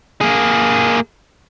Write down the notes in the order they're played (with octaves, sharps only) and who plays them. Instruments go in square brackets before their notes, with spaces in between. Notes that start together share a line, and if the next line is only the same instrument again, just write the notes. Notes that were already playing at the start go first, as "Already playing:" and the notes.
[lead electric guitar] A#3 G#4